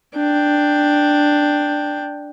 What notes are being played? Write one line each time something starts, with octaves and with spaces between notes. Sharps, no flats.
D4 G5